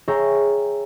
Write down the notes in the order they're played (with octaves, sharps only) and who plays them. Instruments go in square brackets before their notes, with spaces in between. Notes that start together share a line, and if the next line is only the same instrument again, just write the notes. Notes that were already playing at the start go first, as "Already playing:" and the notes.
[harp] G#4 C#5 E5 G5 A#5 C#6